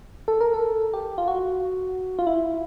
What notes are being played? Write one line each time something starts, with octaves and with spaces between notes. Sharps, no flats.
A4
A#4
A4
G4
F4
F#4
F4
E4